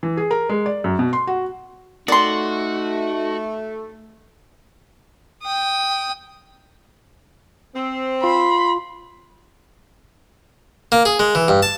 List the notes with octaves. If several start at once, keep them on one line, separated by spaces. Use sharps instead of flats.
E3
G#4
A#4
G#3
D5
F#2
B2
C6
F#4
A3 D#4 F#4 D5 C6
G5 D#6
C4
F4 B5 C6
A#3
G#4
G#3
E3
G2
A5